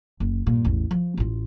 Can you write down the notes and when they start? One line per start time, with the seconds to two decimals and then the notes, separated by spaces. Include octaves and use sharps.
0.20 F#1
0.46 G2 A#2
0.65 A1 E2
0.91 F3
1.17 A1 F4